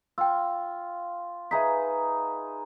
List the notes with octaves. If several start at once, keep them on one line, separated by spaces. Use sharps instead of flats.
F4 G5 E6
D#4 G#4 B4 E5 A#5 B6